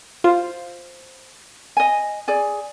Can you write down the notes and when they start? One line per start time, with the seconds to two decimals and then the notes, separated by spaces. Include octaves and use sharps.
0.24 F4 C5
1.77 D#5 G#5
2.28 G#4 D5 G#5